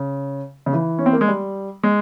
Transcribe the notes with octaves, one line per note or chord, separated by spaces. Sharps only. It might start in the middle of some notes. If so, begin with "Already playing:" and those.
Already playing: C#3
C#3
E3
C#4
C4
A#3
G#3
G3
G#3